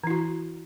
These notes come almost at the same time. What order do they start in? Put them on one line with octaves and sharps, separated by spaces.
E3 E4 F#4